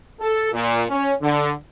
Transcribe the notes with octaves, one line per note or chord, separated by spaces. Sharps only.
A4
A#2
C#4
D3